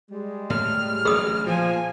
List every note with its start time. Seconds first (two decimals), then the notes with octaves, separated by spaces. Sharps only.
0.10 G3 G#3
0.50 A2 F6
1.05 A1 D2 F#3 G#4 D#6
1.46 A#2 F3 G#5